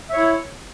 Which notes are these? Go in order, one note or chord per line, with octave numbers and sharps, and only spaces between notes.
E4 C#5 E5